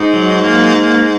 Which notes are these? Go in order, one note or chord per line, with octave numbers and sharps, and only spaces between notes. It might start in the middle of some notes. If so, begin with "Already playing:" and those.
Already playing: G#2 D#4
F#3
A#3